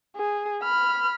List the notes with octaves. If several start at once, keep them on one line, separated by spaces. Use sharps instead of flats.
G#4
B5 F6